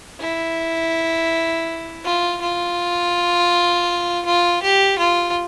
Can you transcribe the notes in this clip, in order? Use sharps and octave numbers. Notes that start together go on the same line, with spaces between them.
E4
F4
F4
F4
G4
F4